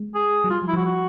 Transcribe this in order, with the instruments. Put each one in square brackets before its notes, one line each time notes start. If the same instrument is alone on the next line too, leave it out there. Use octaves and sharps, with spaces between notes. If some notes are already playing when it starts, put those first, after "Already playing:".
Already playing: [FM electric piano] G#3
[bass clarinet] G#4
[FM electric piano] F#3
[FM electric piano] G3 [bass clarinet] F4
[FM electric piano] F3
[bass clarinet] E4
[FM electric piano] F3 [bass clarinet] F#4
[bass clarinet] F#4